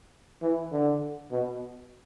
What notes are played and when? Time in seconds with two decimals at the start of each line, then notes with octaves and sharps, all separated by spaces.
0.42 E3
0.72 D3
1.31 B2